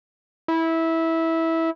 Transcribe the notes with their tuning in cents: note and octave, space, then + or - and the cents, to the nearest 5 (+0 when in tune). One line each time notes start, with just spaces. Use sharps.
E4 -15